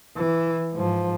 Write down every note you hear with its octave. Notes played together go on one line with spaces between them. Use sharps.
E3
G#2 F3